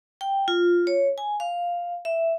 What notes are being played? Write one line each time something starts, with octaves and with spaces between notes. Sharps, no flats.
G5
F4
C#5
G#5
F5
E5